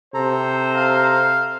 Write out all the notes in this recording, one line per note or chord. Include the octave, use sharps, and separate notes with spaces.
C3 A4 C5 A#5
F5